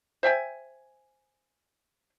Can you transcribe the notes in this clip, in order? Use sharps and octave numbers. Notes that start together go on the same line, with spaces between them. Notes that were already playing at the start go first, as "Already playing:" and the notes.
C5 E5 G5 G#5